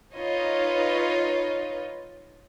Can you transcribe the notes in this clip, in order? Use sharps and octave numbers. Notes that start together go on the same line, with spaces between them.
D#4 F4 B4 C#5 D#5